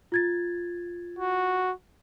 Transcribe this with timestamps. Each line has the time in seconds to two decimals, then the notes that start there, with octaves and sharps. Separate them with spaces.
0.12 F4 G#6 A6
1.19 F#4